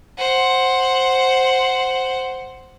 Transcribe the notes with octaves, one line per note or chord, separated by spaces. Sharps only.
C5 F#5